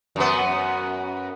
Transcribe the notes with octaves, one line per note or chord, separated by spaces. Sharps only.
F#2 B3